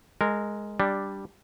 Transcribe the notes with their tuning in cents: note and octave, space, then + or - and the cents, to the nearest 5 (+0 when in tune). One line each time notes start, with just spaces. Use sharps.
G#3 +0 A#4 -15
G3 +0 D4 +0